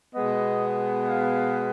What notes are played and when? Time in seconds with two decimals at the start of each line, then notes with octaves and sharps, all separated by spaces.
0.15 B2 G#3 B3 D#5
1.09 F5